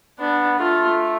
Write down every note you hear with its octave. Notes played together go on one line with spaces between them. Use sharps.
B3 D4
A3 F4